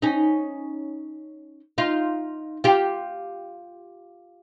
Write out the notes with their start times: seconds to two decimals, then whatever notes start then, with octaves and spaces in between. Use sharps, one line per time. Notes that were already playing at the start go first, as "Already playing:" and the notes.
0.02 C#4 D#4
1.78 D#4 F4
2.64 F4 G4